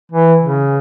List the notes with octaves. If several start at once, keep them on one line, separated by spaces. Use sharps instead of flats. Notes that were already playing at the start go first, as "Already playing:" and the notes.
E3
C#3